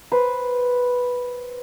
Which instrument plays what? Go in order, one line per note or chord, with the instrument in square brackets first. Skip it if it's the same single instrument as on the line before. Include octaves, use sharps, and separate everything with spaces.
[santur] B4 C5